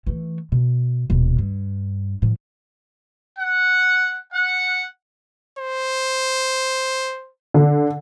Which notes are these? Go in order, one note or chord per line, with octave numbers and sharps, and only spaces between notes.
E3 A3
B2
D#1 B2
G2
A2 F3
F#5
F#5
C5
D3